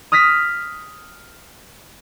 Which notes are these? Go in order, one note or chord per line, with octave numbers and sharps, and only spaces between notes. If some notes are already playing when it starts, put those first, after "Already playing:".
D#6 F6 A#6 B6